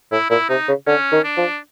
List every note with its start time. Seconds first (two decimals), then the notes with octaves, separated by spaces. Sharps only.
0.12 A2 E4
0.30 A#2 E4
0.49 C3 D#4
0.68 C#3
0.87 D3 C#4
1.12 D#3
1.24 D4
1.37 F3